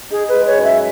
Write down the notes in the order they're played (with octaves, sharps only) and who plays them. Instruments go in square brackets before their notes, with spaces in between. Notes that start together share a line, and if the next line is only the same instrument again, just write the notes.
[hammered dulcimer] D#4 [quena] G#4
[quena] B4
[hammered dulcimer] G#3
[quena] C#5
[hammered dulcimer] F#2
[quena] E5